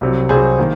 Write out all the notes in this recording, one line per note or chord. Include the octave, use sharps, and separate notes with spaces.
C2 C3 F#3
C2 C3 F#3 G#4 C5
D#3 A#3